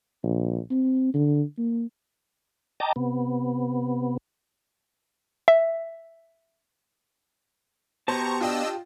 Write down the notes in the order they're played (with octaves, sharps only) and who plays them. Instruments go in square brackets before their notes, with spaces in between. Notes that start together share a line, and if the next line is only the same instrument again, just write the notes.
[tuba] A#1
C4
D3
A#3
[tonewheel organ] D#5 G5 A5 A#5 D6
C3 B3
[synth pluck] E5
[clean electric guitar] B2 [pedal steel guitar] G4 A5 [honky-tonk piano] C5 [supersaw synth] A#5 C#6
[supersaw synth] D4 D#5 E6 [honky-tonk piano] F4 G5